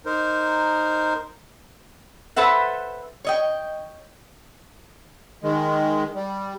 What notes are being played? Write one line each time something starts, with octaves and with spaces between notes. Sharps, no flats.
D#4 A#4 C5
A4 B4 C5 E5 F#5
C#5 D#5 G5
D#3 G#3
G3